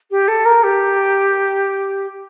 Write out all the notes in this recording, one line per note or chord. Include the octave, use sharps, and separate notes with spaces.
G4
A4
A#4
G4